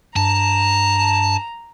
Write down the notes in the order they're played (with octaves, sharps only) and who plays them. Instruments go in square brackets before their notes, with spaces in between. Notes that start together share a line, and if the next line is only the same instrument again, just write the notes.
[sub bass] G2 [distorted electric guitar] A5 [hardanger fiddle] A#5